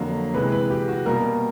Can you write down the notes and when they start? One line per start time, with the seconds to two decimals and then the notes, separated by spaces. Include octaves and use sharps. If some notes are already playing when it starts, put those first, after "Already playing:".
Already playing: F2 D3 F#3 A#3
0.34 C3 E3 G#3 B4
0.52 B4
0.70 G4
0.88 F#4
1.06 B2 G3 A#3 A#4